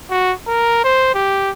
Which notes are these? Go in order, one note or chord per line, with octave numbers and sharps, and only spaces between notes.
F#4
A#4
C5
G4